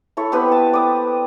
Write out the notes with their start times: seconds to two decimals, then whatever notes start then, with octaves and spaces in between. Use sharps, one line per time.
0.17 E4 A4 C#5
0.32 B3 C4 G4 B4
0.52 A5
0.73 D5 D#6